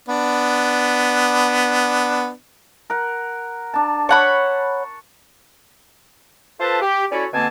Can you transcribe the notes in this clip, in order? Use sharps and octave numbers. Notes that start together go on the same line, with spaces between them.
B3 D4
A#4 F#5
D4 A5
C#5 F#5 A5 B5 C#6
F4 A4 B4 C5 A5
G4
C#4 E4 F#4 A4 C#5 D5
B2 D3 A#3 C4 G#5 A5